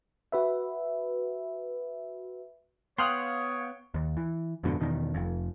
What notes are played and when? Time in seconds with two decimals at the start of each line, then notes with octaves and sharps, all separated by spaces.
0.32 F#4 B4 E5
2.98 B3 C#5 F5 G5 C6 D#6 F6 F#6
3.94 D#2
4.17 E3
4.64 F2 G#2 B2 D3
4.80 E2 B2 D#3
5.14 F1 F2